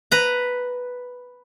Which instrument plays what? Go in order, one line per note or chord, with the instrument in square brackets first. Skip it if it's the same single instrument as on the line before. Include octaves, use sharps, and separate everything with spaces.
[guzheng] B4 A#5